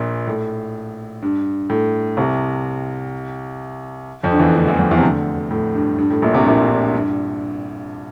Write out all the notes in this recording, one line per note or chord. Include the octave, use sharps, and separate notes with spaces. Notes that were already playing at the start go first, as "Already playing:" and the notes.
Already playing: A#1 A#2
A2
G2
A2
C2 C3
F2 F3
D3
E2 E3
D2 D3
E2 E3
F2 F3
E2 E3
C3
D2 D3
A2
G2
G2
A2
A#1 A#2
C2 C3
A#1 A#2
G2